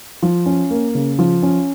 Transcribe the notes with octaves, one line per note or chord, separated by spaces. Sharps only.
F3
C#4
A#3
C#3
F3
C#4